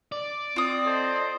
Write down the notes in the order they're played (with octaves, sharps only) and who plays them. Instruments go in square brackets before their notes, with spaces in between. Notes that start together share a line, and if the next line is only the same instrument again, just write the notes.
[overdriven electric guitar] D5
[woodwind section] C4 [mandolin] F4 D#6
[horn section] A4 C5 D#5